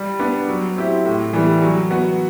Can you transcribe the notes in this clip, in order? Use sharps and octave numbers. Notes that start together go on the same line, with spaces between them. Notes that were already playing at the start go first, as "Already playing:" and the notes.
Already playing: G3
B3 D4
F#3
C4 E4 G4
A2
E3 G3 B3
F#3
B3 F#4